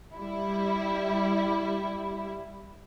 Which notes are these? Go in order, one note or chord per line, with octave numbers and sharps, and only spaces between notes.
G3 E4